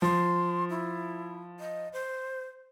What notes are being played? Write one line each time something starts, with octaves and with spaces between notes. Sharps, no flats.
F3 C6
E4
D#5
C5